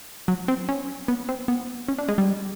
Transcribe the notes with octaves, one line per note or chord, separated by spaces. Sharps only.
F#3
C4
C#4
B3
C4
B3
C#4
D4
G#3
G3